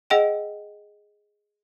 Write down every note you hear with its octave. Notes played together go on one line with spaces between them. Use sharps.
G#4 D#5 F#5 G5